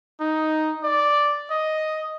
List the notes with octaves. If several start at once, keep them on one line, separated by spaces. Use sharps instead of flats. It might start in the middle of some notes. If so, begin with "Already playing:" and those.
D#4
D5
D#5